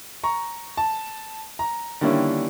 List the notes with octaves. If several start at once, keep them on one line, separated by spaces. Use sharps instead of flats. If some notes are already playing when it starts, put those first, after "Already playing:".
A#5 C#6
A5
A#5
D3 D#3 G3 A#3 C#4 E4